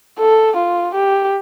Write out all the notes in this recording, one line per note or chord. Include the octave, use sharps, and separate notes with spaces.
A4
F4
G4